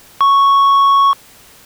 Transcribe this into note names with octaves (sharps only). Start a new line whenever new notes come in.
C#6